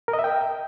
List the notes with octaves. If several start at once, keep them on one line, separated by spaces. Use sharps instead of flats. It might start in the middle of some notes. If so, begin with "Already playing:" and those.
A#4
D#5
E5
G5